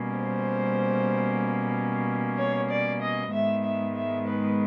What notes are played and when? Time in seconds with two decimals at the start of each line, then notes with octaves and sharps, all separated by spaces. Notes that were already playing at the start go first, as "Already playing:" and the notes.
Already playing: B2 G3 A#3 C#4
0.17 C5
2.38 C#5
2.69 D5
3.01 D#5
3.33 G#2 D#3 G#3 B3 E5
3.64 E5
3.95 E5
4.27 B4